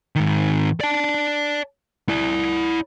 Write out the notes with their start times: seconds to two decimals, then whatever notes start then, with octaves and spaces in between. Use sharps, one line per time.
0.16 G#2 D#3
0.80 D5 A5
2.09 E4 D5